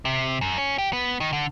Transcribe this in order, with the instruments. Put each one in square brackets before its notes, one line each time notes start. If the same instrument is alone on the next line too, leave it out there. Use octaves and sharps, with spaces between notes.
[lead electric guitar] C3
F#2
C#4
G4
B3
D#3
D3